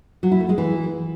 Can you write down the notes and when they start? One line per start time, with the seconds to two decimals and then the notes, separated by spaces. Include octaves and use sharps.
0.23 F#3
0.32 E4
0.40 A3
0.49 G#3
0.58 E3